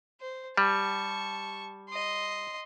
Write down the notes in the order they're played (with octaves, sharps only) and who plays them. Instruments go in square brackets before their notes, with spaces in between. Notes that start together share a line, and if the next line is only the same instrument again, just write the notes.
[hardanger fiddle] C5
[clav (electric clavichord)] G3 [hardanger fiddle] A5 C#6
[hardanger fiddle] D#5 C6